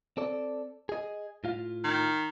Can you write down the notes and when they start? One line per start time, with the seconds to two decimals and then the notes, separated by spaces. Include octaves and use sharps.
0.17 C4 A4 D5
0.89 G#4 D#5
1.44 A2 F4 F5
1.84 D#3